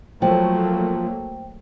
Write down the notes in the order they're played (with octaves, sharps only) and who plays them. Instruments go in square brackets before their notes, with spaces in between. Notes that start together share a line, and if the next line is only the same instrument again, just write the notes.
[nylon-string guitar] F3 [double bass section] F#3 A3 A#3 [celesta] C5 G5